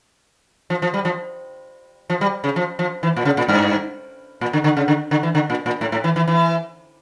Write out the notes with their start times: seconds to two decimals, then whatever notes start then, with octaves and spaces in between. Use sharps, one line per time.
0.70 F3
0.82 F3
0.94 G3
1.05 F3
2.10 F3
2.21 G3
2.44 C#3
2.56 F3
2.79 F3
3.03 E3
3.16 A#2
3.25 C#3
3.37 A#2
3.48 G2
4.41 A#2
4.53 D3
4.64 D3
4.77 C#3
4.88 D3
5.11 D3
5.23 E3
5.35 D3
5.50 A#2
5.66 A#2
5.81 A2
5.92 A2
6.04 E3
6.16 E3
6.28 E3